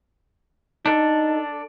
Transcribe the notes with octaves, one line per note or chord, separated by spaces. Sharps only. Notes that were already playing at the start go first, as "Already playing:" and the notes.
D4 D#4 A4